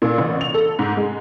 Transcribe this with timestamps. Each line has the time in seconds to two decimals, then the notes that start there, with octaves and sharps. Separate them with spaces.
0.02 A#2
0.18 A1
0.41 F7
0.54 A4
0.79 G#2
0.97 G#3